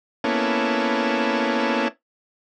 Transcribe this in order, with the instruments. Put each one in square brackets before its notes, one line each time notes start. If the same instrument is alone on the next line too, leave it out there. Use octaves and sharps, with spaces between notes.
[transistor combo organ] A#3 B3 C#4 E4 A4